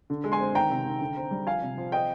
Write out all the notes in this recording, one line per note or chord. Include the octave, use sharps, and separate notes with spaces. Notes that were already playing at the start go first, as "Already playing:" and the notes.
D3
G#3
G#5 C6
C4
D#3 G5 A#5
C3
D#3
D3
C4
G3
F3 F5 G#5
C3
F3
C4 D#5 G5